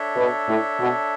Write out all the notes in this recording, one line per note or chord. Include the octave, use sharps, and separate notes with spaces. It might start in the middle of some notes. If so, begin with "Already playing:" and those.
Already playing: D4 A4 C#5 E5
B2
A2
B2